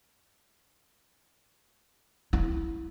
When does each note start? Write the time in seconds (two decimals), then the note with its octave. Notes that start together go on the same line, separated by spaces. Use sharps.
2.33 E4